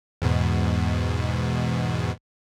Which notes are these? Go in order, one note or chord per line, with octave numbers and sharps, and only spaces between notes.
E2 G#2 B2